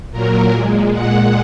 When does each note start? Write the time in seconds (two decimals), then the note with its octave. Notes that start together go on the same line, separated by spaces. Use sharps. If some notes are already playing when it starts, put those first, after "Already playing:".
0.11 A#2 F#3 A#4
0.51 A#2 G#3
0.92 G#3 F#5
0.97 A#2